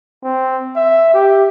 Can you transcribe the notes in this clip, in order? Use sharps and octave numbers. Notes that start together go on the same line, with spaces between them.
C4
E5
G4